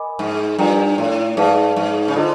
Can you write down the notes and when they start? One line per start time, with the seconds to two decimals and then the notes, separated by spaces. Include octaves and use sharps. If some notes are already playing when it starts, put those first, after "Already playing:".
Already playing: A#4 D#5 G#5 B5 D6
0.19 G#2
0.59 G2 F4 A#4 D5 G5 A#5
0.98 A2
1.37 G#2 G#4 B4 D5 F5 A5
1.76 G#2
2.08 C#3
2.15 D3 F4 A4 C5 D#5